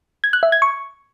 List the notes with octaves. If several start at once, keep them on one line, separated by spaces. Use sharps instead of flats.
G#6
F#6
E5
G#6
C#6